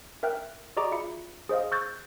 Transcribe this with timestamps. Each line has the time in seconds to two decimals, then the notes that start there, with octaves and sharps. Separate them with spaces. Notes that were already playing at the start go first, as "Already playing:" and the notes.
0.23 A#4 E5 G5 F6 F#6
0.77 F#4 G#4 D5 D#5 A#5 D6
0.92 F4 E5 B5 C#7
1.49 G#4 C5 D#5 F5
1.72 C#6 E6 F#6 G6 A6